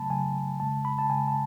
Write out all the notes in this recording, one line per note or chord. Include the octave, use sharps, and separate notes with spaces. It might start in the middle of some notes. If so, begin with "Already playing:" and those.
Already playing: C#3 F#3 A3 A5 B5
C#3 F#3 A3 G#5
C#3 G#3 A5
B5
A5
C#3 G#3 G#5
A5